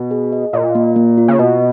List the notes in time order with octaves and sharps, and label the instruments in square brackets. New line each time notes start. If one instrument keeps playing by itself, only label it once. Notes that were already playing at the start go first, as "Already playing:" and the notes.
Already playing: [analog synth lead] B2
[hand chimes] G#4
D#5
[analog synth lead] A#2 [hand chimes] D#5
[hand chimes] A#3
A#3
F4
[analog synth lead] C#3
[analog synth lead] B2 [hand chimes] D#5